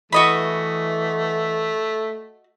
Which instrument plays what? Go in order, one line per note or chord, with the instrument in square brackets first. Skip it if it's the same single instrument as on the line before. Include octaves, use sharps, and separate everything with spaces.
[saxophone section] E3 [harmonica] A3 [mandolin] F#4 D#5 B5